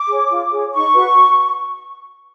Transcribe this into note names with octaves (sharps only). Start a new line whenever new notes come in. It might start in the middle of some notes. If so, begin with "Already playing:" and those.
Already playing: D6
G#4 C#5
F4
G#4 C#5
D#4 C#6
F#4 B4